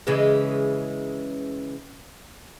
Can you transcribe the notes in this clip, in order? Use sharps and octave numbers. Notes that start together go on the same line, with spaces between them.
C#3 E3 G#3